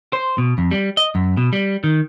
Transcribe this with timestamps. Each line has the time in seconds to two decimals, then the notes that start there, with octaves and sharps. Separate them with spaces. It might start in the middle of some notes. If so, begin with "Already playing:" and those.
0.13 C5
0.38 B2
0.58 F2
0.71 G3
0.97 D#5
1.15 F#2
1.37 B2
1.53 G3
1.84 D#3